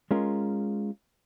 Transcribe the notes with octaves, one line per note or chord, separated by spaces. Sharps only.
G#3 C#4 F4 A#4